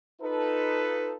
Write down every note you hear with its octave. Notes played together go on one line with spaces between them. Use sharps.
D#4 F4 A4 B4